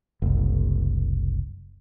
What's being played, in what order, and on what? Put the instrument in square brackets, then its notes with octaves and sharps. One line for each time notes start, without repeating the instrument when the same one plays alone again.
[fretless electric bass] F#1 C2